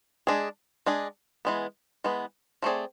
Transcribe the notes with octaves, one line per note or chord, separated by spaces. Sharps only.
G#3 D4 G#4
G#3 D4 G#4
E3 G#3 B3
E3 G#3 B3
F3 A3 C4 G#4 D5